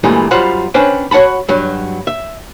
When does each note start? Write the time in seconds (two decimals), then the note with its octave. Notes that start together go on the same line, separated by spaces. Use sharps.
0.04 G2 A#2 E3 G#3 A3 G4
0.31 F#2 G3 F4 C5 F#5 B5
0.74 C#4 D4 B4 C5 G5
1.11 F#4 C#5 F#5 A5 B5
1.49 G2 F#3
2.07 E5